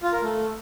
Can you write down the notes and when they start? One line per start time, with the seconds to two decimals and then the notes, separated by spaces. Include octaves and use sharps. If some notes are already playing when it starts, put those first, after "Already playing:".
0.03 F4
0.12 A#4
0.22 A3